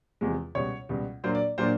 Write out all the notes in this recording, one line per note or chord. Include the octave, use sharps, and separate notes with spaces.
E2 C3 F3 G#3
C#2 B2 G3 C#5
C#2 B2 G3
A#2 F#3 A#3 D4 C5
D5
A#2 F#3 A#3 D4 C5